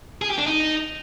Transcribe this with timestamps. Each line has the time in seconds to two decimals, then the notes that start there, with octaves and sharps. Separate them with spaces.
0.22 G#4
0.30 G4
0.38 D4
0.46 D#4